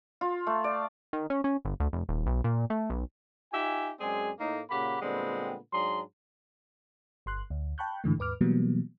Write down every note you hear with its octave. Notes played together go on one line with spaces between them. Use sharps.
F4
A3
D5
D#3
C#4
C#4
G1
D2
F1
D#1
B1
A#2
A3
B1
D#4 F4 G4 E5 G#5
F#2 G#3 C4 G#4 D5 G#5
A2 A#3 D#4
A#2 C#3 A#3 G4 F#5 B5
A#2 D3 G3 G#3 B3 C4
G#2 F#3 D4 G#4 A#5 C6
G1 C6 F#6
D2
G5 A5 B5 C#6 F#6 G6
G#2 D3 E3 A3
D#2 G#2 B4 D6 F6
B2 E3 F#3 G3 A#3 B3